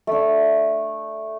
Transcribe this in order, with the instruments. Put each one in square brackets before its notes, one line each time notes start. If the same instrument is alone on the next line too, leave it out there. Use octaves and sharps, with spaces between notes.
[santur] A3 D4